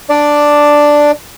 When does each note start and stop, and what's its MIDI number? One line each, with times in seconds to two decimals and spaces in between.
0.10 1.11 62
0.10 1.11 74